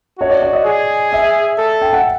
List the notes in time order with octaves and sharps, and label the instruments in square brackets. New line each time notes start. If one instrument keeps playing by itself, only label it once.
[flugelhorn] F#4 [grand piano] C#5
[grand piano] D5
D5
D#5
[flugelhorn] G#4
[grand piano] E5
[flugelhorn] A4
[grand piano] G5
F#5